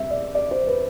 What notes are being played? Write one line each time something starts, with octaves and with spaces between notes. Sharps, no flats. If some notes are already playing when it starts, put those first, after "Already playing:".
Already playing: C3 G3 E5
D5
D5
C5
B4